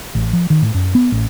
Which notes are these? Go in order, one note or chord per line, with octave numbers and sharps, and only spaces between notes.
A1
F3
D#3
A2
F#2
B3
A1